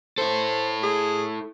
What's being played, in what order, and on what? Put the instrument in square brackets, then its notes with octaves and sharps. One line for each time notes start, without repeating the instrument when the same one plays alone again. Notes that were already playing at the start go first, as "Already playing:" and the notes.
[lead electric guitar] E4 A4 [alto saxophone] C5
[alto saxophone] G#4